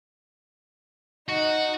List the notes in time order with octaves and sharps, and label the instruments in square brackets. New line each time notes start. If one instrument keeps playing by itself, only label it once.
[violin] D#4 [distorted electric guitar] F#4